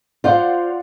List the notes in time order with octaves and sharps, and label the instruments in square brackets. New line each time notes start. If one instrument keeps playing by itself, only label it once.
[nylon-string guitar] F4 C5 [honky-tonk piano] D5 F5 F#5